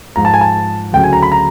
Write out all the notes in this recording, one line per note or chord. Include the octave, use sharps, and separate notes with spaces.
G#2 F3 A#5
A5
G#5
A5
D2 C#3 F#3 G5
G#5
A#5
B5
A#5